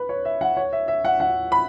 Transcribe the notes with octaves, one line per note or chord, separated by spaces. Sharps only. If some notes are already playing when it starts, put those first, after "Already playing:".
Already playing: B4
C#5
E5
F#5
C#5
E5
E5
F#5
F#5
B5